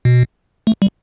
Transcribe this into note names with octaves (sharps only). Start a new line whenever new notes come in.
B2
A3
G3